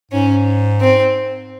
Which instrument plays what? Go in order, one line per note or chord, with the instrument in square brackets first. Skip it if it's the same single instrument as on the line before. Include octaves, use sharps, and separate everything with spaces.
[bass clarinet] G#2 [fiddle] C#4
[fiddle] C4